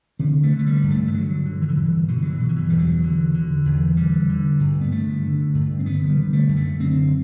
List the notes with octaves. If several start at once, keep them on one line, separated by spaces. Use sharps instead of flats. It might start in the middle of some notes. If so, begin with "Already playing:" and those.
D3 C4
A3
D3
A3
G3
G2
A3
E3
D3 F#3
D3
E3
D3
G2 E3
B2 D3
F#3
E3
B2
D3
E3
E2 G3
F#3
D3
D3
E2
D3 G3
D3
G2
B3
D3 A3
D3
G2
C4
D3 B3
F#3
G3
D3
A3
F#2
A3
D3 C4